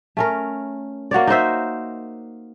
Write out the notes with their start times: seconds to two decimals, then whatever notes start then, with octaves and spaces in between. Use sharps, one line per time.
0.17 A3 C#4 A#4
1.11 A#3 F#4 C#5 D5
1.27 D#4 A#4 C5 E5